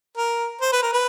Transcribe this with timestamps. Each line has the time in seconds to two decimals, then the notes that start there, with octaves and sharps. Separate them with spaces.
0.18 A#4
0.61 C5
0.72 B4
0.83 A#4
0.93 B4